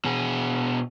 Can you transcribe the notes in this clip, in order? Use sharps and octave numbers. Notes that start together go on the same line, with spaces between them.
B2 G#4